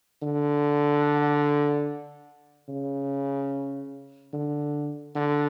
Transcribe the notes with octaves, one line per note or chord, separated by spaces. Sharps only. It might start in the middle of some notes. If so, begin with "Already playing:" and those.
D3
C#3
D3
D3